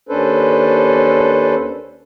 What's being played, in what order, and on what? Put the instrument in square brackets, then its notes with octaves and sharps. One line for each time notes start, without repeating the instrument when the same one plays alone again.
[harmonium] D#2 C#4 D4 A4 B4 C5